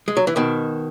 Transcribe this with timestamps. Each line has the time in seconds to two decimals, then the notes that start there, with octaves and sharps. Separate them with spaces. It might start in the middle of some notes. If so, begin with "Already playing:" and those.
0.08 G#3
0.17 F#3
0.27 E3
0.36 B2 D#3